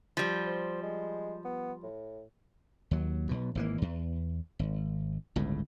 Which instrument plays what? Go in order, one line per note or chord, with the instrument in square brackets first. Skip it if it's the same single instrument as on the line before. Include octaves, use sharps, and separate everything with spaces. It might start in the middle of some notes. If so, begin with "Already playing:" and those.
[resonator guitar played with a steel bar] F3 G3
[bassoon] C5
G#3
B3
A2
[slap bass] D#2 F#3
B1 B2
G#1 E3 A#3
E2
G#1
G1 C#2 A2